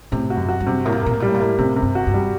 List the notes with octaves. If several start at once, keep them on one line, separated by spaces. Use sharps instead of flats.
A2 C3
F#4
F#2
F#4
G2
C3
A2 A#3
A#2
A2
A#2 A#3
A2
A#2 G3
A2
A#2
A2 A#3
A2 C3
C3
G2
F#4
G2
G3